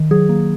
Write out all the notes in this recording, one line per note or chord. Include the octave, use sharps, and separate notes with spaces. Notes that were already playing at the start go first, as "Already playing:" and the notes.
Already playing: D#3
F#3 G#4
A#3